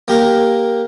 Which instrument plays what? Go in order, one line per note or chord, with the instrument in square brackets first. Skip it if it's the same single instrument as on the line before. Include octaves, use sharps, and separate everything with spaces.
[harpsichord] A#3 G4 A#4